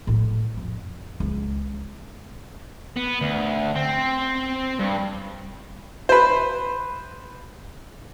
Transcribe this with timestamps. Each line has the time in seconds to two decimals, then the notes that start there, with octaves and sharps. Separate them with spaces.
0.07 A2 F#3
0.57 F2
1.20 C#2
2.97 B3
3.21 D2
3.75 C4
4.79 G2
6.09 B4 C5